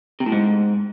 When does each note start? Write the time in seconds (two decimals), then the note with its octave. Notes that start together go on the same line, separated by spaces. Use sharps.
0.20 C3
0.26 A2
0.32 G#2